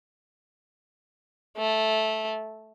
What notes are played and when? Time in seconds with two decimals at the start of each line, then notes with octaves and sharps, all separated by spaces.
1.57 A3